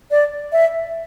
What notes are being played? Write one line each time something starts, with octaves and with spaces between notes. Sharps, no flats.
D5
E5